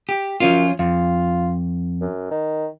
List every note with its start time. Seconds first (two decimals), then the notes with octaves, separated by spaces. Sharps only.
0.09 G4
0.40 F#2 F3 C#4 F4
0.79 F2 F4
2.01 F#2
2.30 D#3